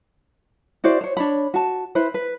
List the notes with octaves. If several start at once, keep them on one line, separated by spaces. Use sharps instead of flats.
E4 F#4 C5 D5
C5 C#5
D4 C#5 B5
F#4 A5
E4 B4 C5
B4